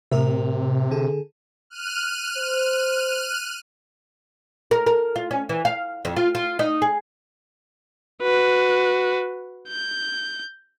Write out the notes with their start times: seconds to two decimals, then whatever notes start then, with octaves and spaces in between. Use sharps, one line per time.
0.11 A2 C3 A#4 E5
0.91 D3 G#4 A4
1.70 F6 F#6 D#7
2.37 C5
4.71 A#4
4.86 A#4
5.16 F4
5.31 C#4
5.49 E3
5.65 F5
6.05 F2
6.16 F4
6.35 F4
6.59 D#4
6.82 G#4
8.23 F#4 B4
9.69 G6